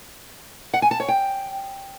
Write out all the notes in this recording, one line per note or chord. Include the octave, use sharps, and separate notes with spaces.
F#5
G#5
A5
C#5
G5